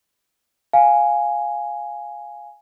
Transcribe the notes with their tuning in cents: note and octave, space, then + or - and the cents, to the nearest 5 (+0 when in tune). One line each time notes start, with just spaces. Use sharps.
F5 +0 G#5 +0